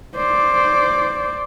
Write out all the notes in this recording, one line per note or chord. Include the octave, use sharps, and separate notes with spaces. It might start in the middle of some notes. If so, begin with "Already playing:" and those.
C5 D5